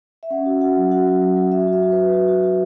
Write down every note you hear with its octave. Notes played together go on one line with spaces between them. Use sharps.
E5
C#4 F#5
F#4
F#4 F#5
F#3
F#4 F#5
F#3
F#3
F#3
F#4 E5
F#4
E5
F#4
B4
F#4
F#4
F#4
F#4